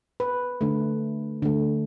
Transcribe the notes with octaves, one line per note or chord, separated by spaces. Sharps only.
B4
D3 A3
D3 A3